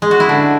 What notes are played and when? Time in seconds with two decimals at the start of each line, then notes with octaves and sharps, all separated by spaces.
0.02 G#3
0.11 F#4
0.20 E4
0.29 D3